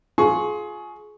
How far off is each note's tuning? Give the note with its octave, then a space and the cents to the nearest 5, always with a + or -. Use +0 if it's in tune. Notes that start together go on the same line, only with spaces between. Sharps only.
F4 +15 G#4 +25 C#6 +0